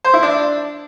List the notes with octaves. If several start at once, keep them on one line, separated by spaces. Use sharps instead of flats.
C5
E4
D4